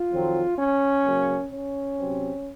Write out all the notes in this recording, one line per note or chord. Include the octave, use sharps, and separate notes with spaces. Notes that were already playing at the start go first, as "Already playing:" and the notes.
Already playing: F4
F2 D#3 F#3 C4
C#4
C#3 F#3 A#3
C#4
C3 F#3 C4